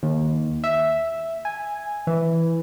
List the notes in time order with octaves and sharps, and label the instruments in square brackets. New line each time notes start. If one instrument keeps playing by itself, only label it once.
[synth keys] D#2
E5
G#5
E3